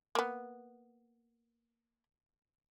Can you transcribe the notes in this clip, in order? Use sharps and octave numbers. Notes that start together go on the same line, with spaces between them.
A#3 B3